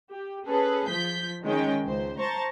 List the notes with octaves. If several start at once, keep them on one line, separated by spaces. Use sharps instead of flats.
G4
C#4 G#4 A4 B4
F3 G6 B6
D#3 G#3 C#4 G5
C#2 C5
C5 A5 A#5 C#6